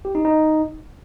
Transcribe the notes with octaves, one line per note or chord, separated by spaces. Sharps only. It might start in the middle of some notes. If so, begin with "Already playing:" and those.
G4
D#4
D#4